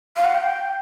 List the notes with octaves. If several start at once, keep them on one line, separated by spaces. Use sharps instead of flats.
F5
F#5
G5